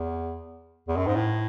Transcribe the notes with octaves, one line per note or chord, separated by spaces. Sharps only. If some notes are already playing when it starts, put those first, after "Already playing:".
Already playing: E2
E2
F#2
G#2
A2